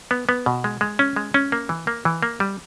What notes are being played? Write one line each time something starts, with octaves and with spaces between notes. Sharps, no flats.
B3
B3
B2
G#3
G#3
C#4
G#3
C#4
A#3
E3
A#3
E3
A#3
G3